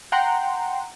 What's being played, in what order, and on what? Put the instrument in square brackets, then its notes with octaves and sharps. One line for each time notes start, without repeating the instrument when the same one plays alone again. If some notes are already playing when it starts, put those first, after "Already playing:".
[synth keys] F#5 G5 A#5 C6